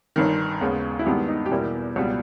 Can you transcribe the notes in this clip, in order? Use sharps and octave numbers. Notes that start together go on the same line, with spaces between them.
G1 G2 D#3
D#2 C#3 G#3 B3
E4
G2 D#3 G#3 B3 G4
D#4
G4
E2 B2 G3 A#3 E4
C#2 B2 G3 B3